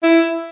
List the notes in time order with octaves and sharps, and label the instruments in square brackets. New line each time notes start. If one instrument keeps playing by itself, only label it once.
[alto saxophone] E4